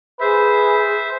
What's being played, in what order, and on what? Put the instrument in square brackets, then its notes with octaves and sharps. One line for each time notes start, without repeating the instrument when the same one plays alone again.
[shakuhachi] G#4 [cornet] B4 [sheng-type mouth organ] C5 E5